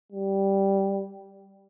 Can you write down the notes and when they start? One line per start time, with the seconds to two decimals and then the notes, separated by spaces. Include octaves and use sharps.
0.12 G3